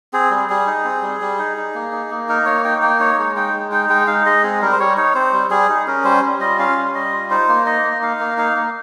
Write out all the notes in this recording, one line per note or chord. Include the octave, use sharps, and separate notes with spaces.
C4 G#4
G3
G3 G#4
D#4
C4
G3
G3
D#4
D#4
A#3
D#4
A#3
D#4 A#4
A#3 C#5
D#4 G5
A#3 G5
D#4 C#5
G#3
D#4 G5
G#3
D#4 G5
G#3 G5
D#4 F5
G#3 D#5
C4 G#4
G3 A#4
C5
G3 C#5
D#4 C#5
C4 C5
G3
G3 G#4
D#4
C#4 A#4
G3 C5
G3
F4 D#5
C#4 F5
G3
G3 D#5
F4
D#4 C5
A#3
D#4 D#5
A#3
D#4 F5
A#3
D#4 F5
A#3